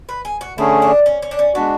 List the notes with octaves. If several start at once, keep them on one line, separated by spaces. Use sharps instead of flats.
B4
G#4
F#4
D3 A3 C#4 E4 G#4
D4
C#4
C#4
D4
C#4
G#3 B3 D4 F#4